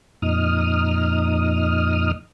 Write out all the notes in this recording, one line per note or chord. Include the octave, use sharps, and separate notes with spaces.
F2 A#2 D#4 D#6 F6